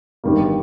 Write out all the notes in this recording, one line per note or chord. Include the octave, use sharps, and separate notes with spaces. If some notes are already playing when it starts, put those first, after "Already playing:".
G1 G2 D#3 G3 A#3